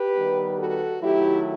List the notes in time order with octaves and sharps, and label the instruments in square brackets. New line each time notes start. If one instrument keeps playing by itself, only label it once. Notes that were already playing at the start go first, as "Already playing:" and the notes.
Already playing: [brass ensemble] G4 B4
D#3 G3 B3
F#4 A4
D#3 F#3 A3 E4 G4